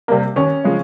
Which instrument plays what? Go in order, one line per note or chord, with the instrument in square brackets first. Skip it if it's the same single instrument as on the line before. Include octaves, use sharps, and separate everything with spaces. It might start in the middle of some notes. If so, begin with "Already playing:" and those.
[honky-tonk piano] C3 G3 A#3
D#2 C#4
C#3 F3 G#3